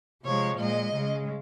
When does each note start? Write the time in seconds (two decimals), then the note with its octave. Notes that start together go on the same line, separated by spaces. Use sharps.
0.23 C3 F3 G#3 C#5
0.58 A#2 G#3 D#5
0.93 C#3 G#3